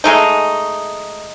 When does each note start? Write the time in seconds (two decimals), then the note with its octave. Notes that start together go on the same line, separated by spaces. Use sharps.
0.04 G#3 A3 D#4